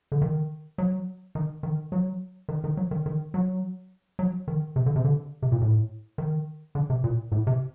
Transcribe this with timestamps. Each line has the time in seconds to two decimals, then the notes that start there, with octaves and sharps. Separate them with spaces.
0.12 D3
0.22 D#3
0.78 F#3
1.35 D#3
1.63 D#3
1.92 F#3
2.49 D#3
2.64 D#3
2.77 F#3
2.91 D#3
3.06 D#3
3.34 F#3
4.19 F#3
4.48 D#3
4.76 C3
4.86 D3
4.96 C3
5.05 D3
5.42 C3
5.52 A#2
5.61 A2
6.18 D#3
6.75 D3
6.90 C3
7.04 A#2
7.32 A2
7.47 C3